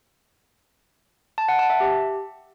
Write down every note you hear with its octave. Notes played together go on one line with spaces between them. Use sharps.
A5
F#5
A5
E5
G4